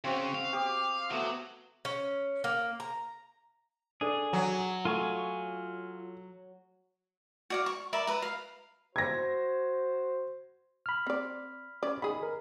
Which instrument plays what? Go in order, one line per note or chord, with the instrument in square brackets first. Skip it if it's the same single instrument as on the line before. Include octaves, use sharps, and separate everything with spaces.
[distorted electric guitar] C#3 [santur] C4 F#4
[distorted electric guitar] F5
[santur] G4 D6 D#6
[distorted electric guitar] F#3 [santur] A3 B3
[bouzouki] C#4
A#3
A#5
[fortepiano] D4 A4 [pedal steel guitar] G#4
[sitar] F#3
[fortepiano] A3 [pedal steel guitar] F4 G#5 C#6
[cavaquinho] F#4 D5 F5
C#6
A#4 D5 E5 B5
B4 A#5
F5
[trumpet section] F#4 C5 [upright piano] G#6 A#6
[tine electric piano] B5 F6
[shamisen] C4 D5
C#4 D5
[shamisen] D#3 G#4 [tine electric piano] B5
[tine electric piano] A#4